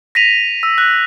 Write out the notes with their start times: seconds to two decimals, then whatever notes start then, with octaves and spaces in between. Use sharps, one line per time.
0.15 A#6 B6 D#7 F7
0.63 E6
0.78 F#6